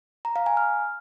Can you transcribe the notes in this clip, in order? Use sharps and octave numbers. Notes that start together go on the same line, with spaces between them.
A#5
F5
G#5
F6